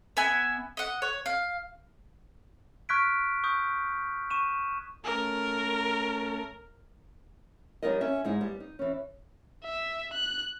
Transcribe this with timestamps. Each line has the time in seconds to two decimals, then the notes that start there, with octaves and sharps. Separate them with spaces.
0.17 B3 E5 G#5
0.77 D#5 F#5
1.02 C#5
1.26 F5
2.89 C#6 F6 F#6 G#6 B6 D7
3.44 C#6 D#6 G6
4.30 C#6 D#7 E7
5.05 A3 C#4 A4 A#4
7.83 F#3 G3 B3 D#4 A#4 D#5
8.01 C#4 E5
8.25 G#2 G#3 D#4 E4
8.41 G3 B3
8.60 D#4
8.79 E3 C#4
9.64 E5
10.13 F#6